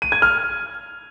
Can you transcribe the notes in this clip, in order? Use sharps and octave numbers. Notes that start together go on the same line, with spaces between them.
D#7
G#6
F6